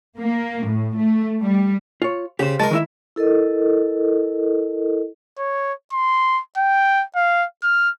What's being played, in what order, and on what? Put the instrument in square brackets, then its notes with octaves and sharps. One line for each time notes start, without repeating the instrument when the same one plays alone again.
[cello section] A#3
A2
A3
G3
[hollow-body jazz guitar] F4 C#5
[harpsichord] C#3 [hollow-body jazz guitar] G4 C5
[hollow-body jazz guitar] C2 F3 A5 [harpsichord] G#3 A#4
[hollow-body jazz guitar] D#3 E4 E5
[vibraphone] E4 A4 A#4 D#5
[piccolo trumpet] C#5
C6
G5
F5
F6